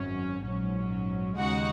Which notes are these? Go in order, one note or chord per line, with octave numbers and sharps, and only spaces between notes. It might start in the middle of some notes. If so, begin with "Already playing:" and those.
Already playing: G#1 F#2 F#3 C#4
A#1 G#2 F#3 C#4
D#2 C#3 G#3 D#4 F#4 F#5